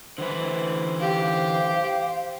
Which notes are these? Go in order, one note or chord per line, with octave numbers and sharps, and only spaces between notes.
D3 E3 B4 C5
G4 F5